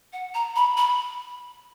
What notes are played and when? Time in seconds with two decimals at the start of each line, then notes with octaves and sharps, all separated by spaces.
0.13 F#5
0.34 A#5
0.56 B5
0.77 B5